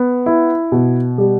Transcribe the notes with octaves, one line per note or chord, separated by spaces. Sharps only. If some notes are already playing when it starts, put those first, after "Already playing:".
Already playing: B3
E4
B2
G3